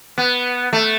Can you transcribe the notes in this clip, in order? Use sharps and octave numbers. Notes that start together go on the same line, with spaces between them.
B3
A3